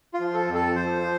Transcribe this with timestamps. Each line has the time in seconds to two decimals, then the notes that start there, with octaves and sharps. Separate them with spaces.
0.14 F4
0.20 F3
0.34 A4
0.48 F2
0.54 A4
0.75 F3 C5
1.03 F3